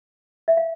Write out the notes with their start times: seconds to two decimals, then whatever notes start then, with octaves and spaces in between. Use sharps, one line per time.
0.48 E5
0.57 F5